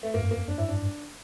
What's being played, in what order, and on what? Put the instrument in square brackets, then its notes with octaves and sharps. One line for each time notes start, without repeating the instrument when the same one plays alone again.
[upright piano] A3
[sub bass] G2 [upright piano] A#3
[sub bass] F2
G2
[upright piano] A#3
[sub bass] F2
[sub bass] F2 [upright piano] D4
[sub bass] G2 [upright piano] E4
[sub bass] G2 [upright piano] D4
[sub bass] G2